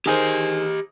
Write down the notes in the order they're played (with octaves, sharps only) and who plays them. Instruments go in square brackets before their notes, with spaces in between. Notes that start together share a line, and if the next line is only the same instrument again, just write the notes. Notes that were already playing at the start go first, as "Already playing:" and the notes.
[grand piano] D#3 G#4 C5 [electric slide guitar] G4 D#5